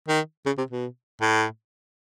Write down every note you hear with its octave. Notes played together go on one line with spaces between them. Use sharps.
D#3
C#3
C3
B2
A2